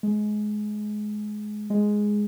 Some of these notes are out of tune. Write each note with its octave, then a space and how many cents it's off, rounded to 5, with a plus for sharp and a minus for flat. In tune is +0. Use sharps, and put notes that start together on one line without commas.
G#3 +20
G#3 +0